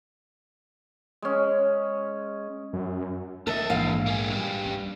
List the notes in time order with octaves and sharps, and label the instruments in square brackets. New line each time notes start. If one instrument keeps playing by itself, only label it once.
[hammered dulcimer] G#3 C#4
[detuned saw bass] F#2
[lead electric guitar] B1 E5 [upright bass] D#3 [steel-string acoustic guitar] A4 D#5
[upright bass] A#1 G#2 [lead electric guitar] E2 [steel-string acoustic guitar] F5
[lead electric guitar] A#3 G#4
G2 G3
[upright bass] C#4